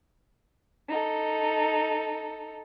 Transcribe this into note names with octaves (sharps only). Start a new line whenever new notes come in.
D#4 A4